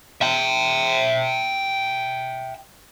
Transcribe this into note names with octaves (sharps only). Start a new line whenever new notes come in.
E5 G5